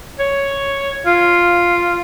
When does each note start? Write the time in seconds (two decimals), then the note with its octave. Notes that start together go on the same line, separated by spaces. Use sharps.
0.19 C#5
1.06 F4